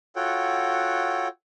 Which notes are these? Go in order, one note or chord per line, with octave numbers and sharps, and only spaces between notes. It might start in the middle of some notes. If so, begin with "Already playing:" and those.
F4 F#4 A4 C#5 F#5 G5